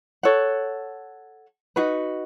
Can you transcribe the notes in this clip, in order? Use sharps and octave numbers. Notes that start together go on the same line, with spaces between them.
A4 C#5 F#5
D#4 F#4 B4